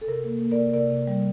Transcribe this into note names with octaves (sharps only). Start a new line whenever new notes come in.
A4
C3 A#4
A#3
A#3
A#4 D5
C3
C3 A#4 D5
C3
G3